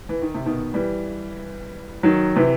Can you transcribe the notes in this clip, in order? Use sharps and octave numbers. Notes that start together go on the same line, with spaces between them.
E3
D#3
C3
B2 D#3
E3 G3
D#3 F#3
C3 E3